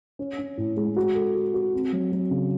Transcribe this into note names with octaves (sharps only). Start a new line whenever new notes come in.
C#4
C#4
A2
G#3
F#4
A4
F#4
F#4
C4
F#3
F#3
C#3